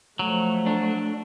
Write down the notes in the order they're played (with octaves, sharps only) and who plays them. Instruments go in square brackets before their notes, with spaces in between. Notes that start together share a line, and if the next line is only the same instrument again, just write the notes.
[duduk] F3 [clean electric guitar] F#3 [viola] A3
[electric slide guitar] D4